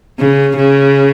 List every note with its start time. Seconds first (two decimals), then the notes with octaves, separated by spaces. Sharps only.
0.19 C#3
0.56 C#3